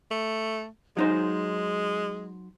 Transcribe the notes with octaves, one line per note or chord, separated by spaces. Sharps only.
A3
F#3 G#3 D#4 C5